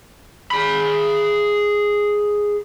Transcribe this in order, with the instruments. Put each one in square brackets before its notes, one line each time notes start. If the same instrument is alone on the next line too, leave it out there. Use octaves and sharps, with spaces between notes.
[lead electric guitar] G#4 B5